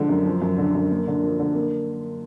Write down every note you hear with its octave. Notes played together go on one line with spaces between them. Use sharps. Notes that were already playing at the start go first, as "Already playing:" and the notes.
Already playing: D3 F3 G#3
F#2
F3
F#2
D3
F#2
A#3
D3
F3
D3
A#3